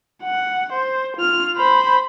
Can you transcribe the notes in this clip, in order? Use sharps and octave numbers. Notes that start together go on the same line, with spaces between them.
F#5
C5
F4 F6
C5 B5